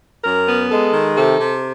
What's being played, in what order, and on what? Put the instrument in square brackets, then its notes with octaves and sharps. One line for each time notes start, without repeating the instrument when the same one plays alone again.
[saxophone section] F#2 A#4
B3
G#3 A4
D#3
C3 A4
C3